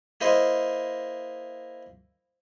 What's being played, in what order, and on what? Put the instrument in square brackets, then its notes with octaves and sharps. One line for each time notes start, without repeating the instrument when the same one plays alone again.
[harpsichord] A#3 E4 C5 D#5